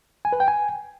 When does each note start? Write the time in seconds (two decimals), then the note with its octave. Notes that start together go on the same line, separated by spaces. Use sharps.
0.25 G#5
0.32 B4
0.40 G5
0.48 G#5